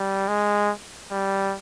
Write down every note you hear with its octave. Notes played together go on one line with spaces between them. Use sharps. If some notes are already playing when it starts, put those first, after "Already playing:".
Already playing: G3
G#3
G3